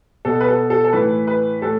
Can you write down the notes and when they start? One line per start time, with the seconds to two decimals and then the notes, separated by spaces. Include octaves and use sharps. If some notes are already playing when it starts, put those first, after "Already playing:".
0.25 B2 A4
0.41 B4
0.48 A4
0.70 A4
0.84 A4
0.93 A2 E3 B4
1.27 B4
1.62 A2 A4